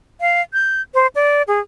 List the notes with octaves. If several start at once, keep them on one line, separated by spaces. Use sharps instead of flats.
F5
G6
C5
D5
G#4